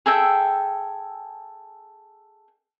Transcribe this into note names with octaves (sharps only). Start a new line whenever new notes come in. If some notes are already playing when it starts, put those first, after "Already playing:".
G#4 A4 E5 G5